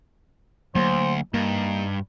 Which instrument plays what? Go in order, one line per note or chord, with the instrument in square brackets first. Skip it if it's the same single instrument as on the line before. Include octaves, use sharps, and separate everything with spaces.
[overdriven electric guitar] D2 [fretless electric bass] F#3 A#3 [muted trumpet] C5
[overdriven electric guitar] G2 [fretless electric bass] A#3 [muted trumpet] D#4